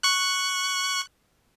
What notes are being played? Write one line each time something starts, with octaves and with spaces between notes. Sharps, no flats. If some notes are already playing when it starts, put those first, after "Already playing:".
C#6 F#6